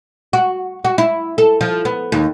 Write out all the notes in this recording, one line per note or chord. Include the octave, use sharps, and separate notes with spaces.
F#4
F#4
E4
A4
F3
B3
D#2